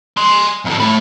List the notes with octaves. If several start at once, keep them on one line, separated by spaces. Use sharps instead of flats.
G#5 C6
F2 A2
A3 B5